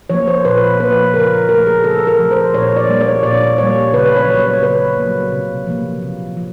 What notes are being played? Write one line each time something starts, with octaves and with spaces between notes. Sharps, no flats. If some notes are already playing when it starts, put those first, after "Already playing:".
F3 A#3 C#5
C5
A#2 B4
F3 A#3 B4
C#3 A#4
F3 A3 A#4
G#4
C#3 A4
A#4
F3 A3
C5
A#2 C#5
D5
G3 A#3
C#5
A#2 D5
G3 A#3 C#5
C#3 B4
C#5
F#3 A#3
C#5
C#3 B4
F#3 A#3
C3
F3 A#3
C3
F3